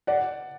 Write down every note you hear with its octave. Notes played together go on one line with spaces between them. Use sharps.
D5 F#5